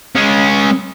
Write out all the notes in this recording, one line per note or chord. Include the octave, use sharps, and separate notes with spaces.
G#3 C#4